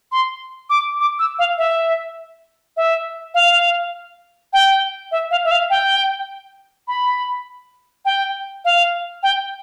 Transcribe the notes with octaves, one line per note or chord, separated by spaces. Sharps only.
C6
D6
D6
E6
F5
E5
E5
F5
G5
E5
F5
E5
F5
G5
B5
G5
F5
G5